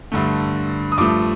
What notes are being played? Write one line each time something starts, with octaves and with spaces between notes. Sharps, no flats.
G2 D3 A3
D#6
G2 F3 A3 D6